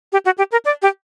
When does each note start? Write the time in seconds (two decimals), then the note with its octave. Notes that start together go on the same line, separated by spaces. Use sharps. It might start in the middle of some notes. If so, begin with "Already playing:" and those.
0.12 G4
0.25 F#4
0.38 G4
0.52 A#4
0.65 D5
0.82 G4